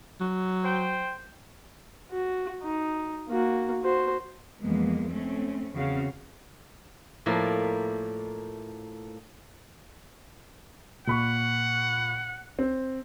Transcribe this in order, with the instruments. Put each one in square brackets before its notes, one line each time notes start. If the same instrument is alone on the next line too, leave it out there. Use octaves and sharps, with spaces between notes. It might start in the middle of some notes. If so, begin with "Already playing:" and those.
[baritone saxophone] F#3
[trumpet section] C5 G5
[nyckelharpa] F#4
D#4
A#3 F#4
F#4 C5
[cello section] F2 E3 G#3 A#3 B3
A3 C4 C#4
E2 C#3 C4 F#4 F5
[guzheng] A2 F3 A#3 E4 D5
[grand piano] A#2 B5 C#6 [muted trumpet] F#5
[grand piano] C4